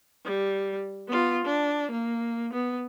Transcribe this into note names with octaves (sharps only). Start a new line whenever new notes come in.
G3
B3 F4
D4
A#3
B3